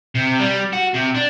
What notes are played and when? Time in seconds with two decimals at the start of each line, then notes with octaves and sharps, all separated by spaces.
0.15 C3
0.40 G3
0.73 F#4
0.94 C3
1.15 D4